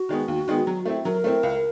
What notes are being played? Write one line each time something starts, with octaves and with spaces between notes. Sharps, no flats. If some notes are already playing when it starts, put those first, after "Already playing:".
Already playing: F#4
D#3 G#3 B3
D#2
D#3 G#3 B3
F#3
A3 C4 E4
F#3 A#4
A3 C4 E4
C#2